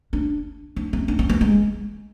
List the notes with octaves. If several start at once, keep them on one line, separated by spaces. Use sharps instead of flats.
D4
D4
C#4
D4
C#4
B3
G#3